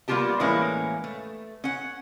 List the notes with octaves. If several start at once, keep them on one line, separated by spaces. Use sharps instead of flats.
G3 A#3 B3 F4 G4 A5
A2 E3 G#3 A#3 C#4
A3
C#4 F#5